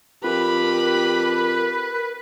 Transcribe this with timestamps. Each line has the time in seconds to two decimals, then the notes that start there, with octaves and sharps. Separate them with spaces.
0.24 F2 G4 A#4 B4 B5